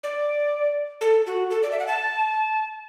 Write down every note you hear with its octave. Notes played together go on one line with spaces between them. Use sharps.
D5
A4
F#4
A4
D5
E5
F#5
A5